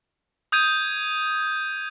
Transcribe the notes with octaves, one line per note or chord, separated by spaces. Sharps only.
D#6 G6 G#6 D#7